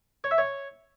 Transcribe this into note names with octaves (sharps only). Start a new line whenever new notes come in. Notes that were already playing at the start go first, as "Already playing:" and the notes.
C#5
E5
C#5